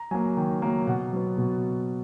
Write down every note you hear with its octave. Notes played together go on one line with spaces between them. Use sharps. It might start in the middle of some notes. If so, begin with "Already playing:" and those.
Already playing: A#5
F#3 A#3 G#5
D#3
F#3 A#3
B2 F#5
F#3 B3
B2